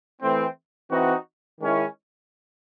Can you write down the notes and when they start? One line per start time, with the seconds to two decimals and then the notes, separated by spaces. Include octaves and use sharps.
0.21 E3 A3 C4
0.90 E3 C4 D#4 F#4
1.60 D#3 G#3 C#4 E4